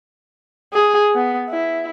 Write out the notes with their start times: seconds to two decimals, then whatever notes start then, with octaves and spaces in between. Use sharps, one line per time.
0.73 G#4
1.14 B3
1.50 E4